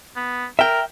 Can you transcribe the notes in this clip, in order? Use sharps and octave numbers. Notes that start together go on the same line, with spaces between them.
B3
A#4 E5 G5